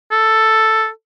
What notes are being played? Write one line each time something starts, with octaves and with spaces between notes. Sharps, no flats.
A4